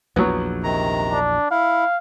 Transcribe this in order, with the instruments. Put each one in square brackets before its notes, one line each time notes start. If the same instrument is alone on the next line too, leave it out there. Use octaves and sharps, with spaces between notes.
[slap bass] A#1 E2 [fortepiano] F#3 B3
[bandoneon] C3 D#3 A#5
[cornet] D4
[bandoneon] E4 [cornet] F5